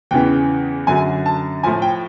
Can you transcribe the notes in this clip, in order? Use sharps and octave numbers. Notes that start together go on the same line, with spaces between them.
E2 C#3 E3 G5
F#2 D3 F#3 G#5
A5
A2 F3 G#5
G5